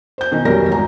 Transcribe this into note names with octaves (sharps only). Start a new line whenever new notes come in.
C5 G6
B2 D#3 E3 D#4
F1 B1 F#3 G3 A#4 A#6
G#1 E2 A#5